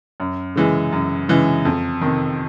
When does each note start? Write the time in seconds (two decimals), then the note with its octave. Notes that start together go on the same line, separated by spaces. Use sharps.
0.20 F#2
0.56 C#3 E3 G#3
0.92 F#2
1.29 C#3 E3 G#3
1.65 F2
2.01 C3 D#3